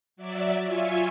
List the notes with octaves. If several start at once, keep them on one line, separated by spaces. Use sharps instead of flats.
F#3 D5 E5
F4 E5 G#5 C#6